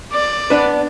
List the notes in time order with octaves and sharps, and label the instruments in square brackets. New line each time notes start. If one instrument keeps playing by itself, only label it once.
[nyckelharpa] D5
[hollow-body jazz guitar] B3 D4 B4